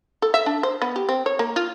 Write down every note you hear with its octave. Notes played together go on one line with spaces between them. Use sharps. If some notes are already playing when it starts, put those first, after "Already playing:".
A4
E5
D4
C5
B3
G4
C4
C#5
A#3
F4